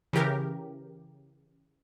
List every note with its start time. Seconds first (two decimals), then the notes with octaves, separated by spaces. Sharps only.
0.13 C#3 E3 G4 A#4